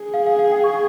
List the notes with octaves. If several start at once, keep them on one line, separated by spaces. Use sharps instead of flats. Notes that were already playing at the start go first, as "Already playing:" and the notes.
Already playing: G#4
F5
F5
F5
G5
C#6